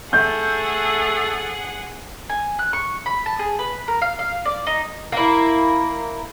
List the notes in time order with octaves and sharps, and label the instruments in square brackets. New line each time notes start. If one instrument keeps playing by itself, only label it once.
[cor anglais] A3 [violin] G#4 F#5 [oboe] A4 [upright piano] G6
[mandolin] G#5
F#6
C#6
B5
A5
G#4
B4
A#4
F5
F5
D5
D#4
[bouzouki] A#3 E4